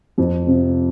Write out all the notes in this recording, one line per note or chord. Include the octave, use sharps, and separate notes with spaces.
F2
C3 F3